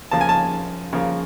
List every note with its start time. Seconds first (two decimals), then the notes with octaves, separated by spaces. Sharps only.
0.11 C#3 F3 A#3 A5
0.21 G#5
0.29 A5
0.93 C#3 F3 A#3